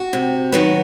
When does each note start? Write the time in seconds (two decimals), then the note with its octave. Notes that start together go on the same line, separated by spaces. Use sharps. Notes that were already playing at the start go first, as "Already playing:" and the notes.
Already playing: F#4
0.13 C3
0.52 D#3 F#3 B3